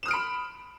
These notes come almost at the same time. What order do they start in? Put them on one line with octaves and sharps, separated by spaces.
E7 D#6 F6 D7 B5